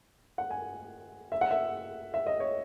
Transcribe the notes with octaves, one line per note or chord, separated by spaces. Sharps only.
F#5
G#5
E5
F#5
E5
E5
D#5
C#5